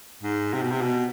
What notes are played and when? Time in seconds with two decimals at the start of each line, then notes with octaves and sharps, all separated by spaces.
0.23 G#2
0.53 C3
0.63 B2
0.71 C3
0.81 B2